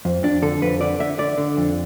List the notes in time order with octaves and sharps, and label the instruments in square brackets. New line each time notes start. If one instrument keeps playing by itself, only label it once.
[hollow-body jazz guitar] F2
F2 D4
D3 A4
F2 B4
D3 D5
D3 E5
D3 D5
D3
F2